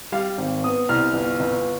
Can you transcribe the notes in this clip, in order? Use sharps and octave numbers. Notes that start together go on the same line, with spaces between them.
G3 F5
G#1
B3 D#6
C2 F6
G1
G1